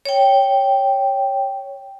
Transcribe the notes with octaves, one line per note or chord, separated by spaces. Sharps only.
C#5 G5